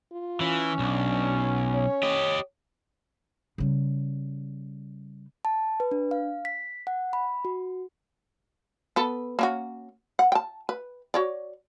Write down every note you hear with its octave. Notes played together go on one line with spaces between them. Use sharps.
F4
E3 C#4
B1 D4
C#5
G4 D#5
C#3 G3
A5
B4
D4
F5
B6
F#5
B5
F#4
B3 A4 B4
A#3 C#4 F#4
F#5
G5 A5
B4
F#4 C#5 D5